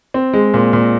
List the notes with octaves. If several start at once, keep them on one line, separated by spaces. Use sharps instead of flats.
C4
G#3
A#2
A#2